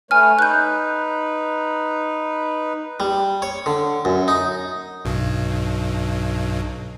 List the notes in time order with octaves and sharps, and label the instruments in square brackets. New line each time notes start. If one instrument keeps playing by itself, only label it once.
[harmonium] A3 B4 C#5 [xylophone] G#5 F6
[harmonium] D#4 B4 [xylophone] F#6 G6
[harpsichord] G3
C#5
D3
F#2
D#4
[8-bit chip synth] B1 G2 B2